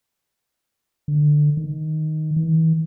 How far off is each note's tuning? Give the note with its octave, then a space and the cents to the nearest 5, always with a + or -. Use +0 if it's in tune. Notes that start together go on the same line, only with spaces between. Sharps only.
D3 +15
D#3 +0
E3 -40